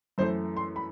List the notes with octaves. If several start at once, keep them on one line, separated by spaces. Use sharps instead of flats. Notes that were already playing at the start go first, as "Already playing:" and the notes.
F#2 E3 A3 C5
C6
B5